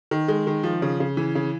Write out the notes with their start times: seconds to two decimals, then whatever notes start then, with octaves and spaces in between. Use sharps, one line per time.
0.11 D#3
0.28 G#3
0.47 D#3
0.63 F3
0.82 C#3
1.00 C#3
1.17 E3
1.35 C#3